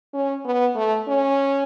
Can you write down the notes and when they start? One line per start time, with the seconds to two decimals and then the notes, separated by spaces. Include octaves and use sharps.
0.14 C#4
0.45 B3
0.76 A3
1.08 C#4